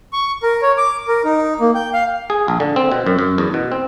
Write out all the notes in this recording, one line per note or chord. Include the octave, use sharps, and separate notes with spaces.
C#6
A#4
C#5
D6
A#4
D#4
A#3
G5
F5
G#4
A#1
D3
C4
B2
F#2
F#2
E2
B2
C4